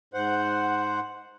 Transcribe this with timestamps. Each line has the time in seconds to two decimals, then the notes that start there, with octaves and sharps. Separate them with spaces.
0.14 G#2 C5 F#5